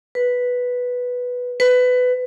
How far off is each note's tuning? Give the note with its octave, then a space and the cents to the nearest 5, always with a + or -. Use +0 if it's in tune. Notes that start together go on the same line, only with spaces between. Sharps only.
B4 -5
B4 +20